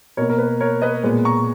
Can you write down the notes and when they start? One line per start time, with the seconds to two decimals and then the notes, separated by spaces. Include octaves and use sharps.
0.17 B2 A#3 A#4 C#5
0.29 A#4
0.39 B4
0.60 A#4 C#5
0.82 B4 D#5
1.03 A#2 G#3 B3
1.25 A#5 C#6